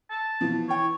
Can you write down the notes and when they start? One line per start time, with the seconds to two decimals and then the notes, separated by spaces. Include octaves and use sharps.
0.10 A5
0.41 B2 E3 F3
0.68 E3 C#5 G5